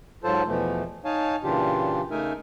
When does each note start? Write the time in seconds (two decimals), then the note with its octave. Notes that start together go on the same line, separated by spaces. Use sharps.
0.24 G#2 F#3 F4 A4 C5 A5
0.46 E2 B2 E3 F3 A3
1.05 D#4 C#5 F5 G#5 A5
1.43 A#2 C#3 E3 D4 F4 G4
2.11 C#3 A3 D#4 A#4 E5 G#5